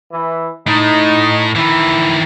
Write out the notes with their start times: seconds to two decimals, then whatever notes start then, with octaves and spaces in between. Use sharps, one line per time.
0.12 E3
0.67 A2 D#4
1.56 D#3 E3 E4